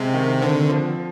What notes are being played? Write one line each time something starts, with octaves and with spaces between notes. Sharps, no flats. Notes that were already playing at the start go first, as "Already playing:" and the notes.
Already playing: C3 G#3
D#3
D3 C4
F3